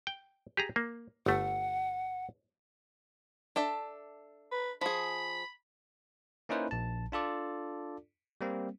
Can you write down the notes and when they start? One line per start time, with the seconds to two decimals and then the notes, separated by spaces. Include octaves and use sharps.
0.07 G5
0.57 G4 G#4 A#5
0.76 A#3
1.26 G1 A3 F#5
3.56 D4 A4 E5
4.52 B4
4.81 F3 G#4 B5
6.49 A#3 C#4 D#4 E4 B4 C5
6.71 A#1 A5
7.12 D4 F4 A4 D5
8.41 G3 A#3 C4